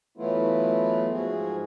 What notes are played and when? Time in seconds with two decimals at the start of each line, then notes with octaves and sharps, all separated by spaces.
0.18 E3 F#3 A3 B3 E4 F4
1.11 G#2 F3 F#4 G#4